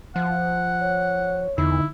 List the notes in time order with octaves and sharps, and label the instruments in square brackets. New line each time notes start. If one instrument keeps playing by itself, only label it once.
[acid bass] F3 [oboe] F#5
[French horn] C#5
[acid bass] E2 [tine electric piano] D3 D#4 [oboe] E4